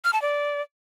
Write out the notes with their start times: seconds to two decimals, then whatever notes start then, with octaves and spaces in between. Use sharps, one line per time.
0.04 F6
0.13 A5
0.22 D5